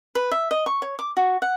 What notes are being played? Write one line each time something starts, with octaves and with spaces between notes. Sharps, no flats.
B4
E5
D#5
C#6
C#5
D6
F#4
F#5